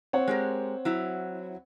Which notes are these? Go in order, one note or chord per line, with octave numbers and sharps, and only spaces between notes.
C4 C#5 F#5
G#3 G4 A#4
F#3 E4